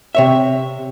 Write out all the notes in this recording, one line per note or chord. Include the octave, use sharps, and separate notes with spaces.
C3 C#5 E5